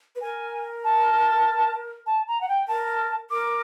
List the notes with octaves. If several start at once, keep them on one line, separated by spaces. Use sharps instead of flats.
B4
A#4 G#5
A5
A5
A#5
F#5
G5
A#4 A5
A#4 D6